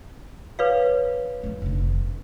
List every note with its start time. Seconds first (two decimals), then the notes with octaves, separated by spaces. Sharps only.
0.59 B4 C#5 F5
1.43 A1 F2
1.62 F1 D3